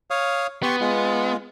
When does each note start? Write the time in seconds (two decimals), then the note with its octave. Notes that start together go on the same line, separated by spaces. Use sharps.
0.11 C#5 F5 D#6
0.63 B3 G4 C6 C#6
0.81 G#3 F4